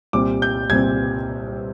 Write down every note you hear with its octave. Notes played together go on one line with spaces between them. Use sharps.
C2 A#2 G3 C4 D6
G6
C2 A#2 G3 C4 G#6